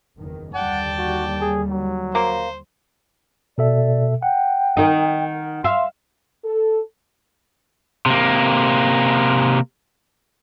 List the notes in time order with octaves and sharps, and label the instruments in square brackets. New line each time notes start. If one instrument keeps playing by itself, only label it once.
[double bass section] F#1 E2 D#3
[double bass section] D#2 D3 G3 [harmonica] D5 G5 A5 [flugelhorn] F#5
[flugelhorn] F#4
G#4
F#3
[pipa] A#3 [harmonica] C5
[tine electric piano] B2 A4 E5 [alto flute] D5
[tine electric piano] F#5 [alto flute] G5
[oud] D#3 D#4
[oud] E5 F5 [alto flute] C6
[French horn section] A4
[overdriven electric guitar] C3 A#3